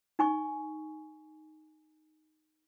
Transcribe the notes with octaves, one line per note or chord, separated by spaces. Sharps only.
D#4 G#5 C#6